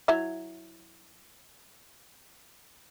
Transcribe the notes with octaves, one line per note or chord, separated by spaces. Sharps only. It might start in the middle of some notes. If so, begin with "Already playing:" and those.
F#3 E4 E5